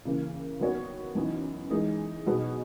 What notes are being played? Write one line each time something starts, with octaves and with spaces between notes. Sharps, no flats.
C#3 E3 A#3
D#3 F#3 B3 F#4 C#5
F#2 E3 B3 D#4
E3 G#3 D#4 G#4 B4
B2 F#3 B3 D#4 G#4